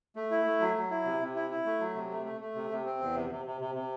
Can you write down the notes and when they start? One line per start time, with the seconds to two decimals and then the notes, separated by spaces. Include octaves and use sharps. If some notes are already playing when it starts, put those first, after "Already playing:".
0.16 A3
0.31 E4
0.46 A3
0.60 F#3
0.76 F#3
0.91 E4
1.05 C3
1.21 C3
1.35 E4
1.51 E4
1.66 A3
1.80 F#3
1.95 C3
2.10 A3
2.26 A3
2.41 A3
2.55 C3
2.71 C3
2.85 C4
3.01 E2
3.15 C3
3.30 C3
3.46 C3
3.61 C3
3.75 C3